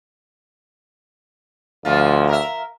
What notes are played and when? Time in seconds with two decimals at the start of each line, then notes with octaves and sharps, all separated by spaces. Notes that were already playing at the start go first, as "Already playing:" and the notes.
1.85 D2 F3 F4
2.29 A#4 E5